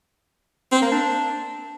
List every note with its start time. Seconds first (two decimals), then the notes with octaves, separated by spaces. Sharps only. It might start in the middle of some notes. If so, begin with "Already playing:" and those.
0.72 C4
0.82 A#3
0.92 D4